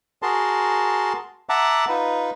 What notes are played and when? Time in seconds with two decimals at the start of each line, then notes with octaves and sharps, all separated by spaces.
0.22 F#4 G#4 A#4 A5 C6
1.49 E5 F#5 A5 A#5 D6
1.89 D#4 F4 B4